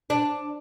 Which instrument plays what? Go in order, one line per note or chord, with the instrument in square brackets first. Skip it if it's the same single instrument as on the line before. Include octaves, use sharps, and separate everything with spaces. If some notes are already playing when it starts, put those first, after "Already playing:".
[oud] D4